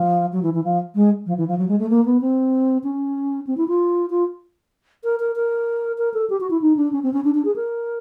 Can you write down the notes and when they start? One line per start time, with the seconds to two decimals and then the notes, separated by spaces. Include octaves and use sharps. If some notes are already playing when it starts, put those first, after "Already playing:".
Already playing: F3
0.32 F#3
0.43 E3
0.54 E3
0.64 F3
0.95 G#3
1.26 F3
1.37 E3
1.48 F3
1.58 F#3
1.68 G#3
1.79 A3
1.90 A#3
2.05 B3
2.21 C4
2.83 C#4
3.47 C4
3.57 E4
3.68 F4
4.10 F4
5.04 A#4
5.20 A#4
5.36 A#4
5.98 A#4
6.14 A4
6.30 G4
6.40 F#4
6.50 E4
6.61 D#4
6.77 D4
6.92 C#4
7.03 C4
7.13 C#4
7.24 D4
7.34 D4
7.45 G#4
7.56 A#4